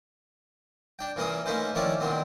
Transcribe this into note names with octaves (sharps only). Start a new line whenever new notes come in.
D4 G5
A#2 E3 A#3 C#4 E4 D#6
A3 A#3 C#4 D#4 B4 C5
D#3 F3 C#4 E4 C#5 D5
A#2 D3 D#3 B3 C4